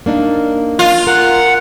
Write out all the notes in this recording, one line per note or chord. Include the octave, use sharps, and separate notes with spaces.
A#3 D4 D#4
F4
A#4 F#5